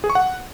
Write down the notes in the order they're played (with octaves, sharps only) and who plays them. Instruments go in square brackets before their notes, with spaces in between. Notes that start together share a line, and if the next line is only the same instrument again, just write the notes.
[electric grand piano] G#4
C#6
F#5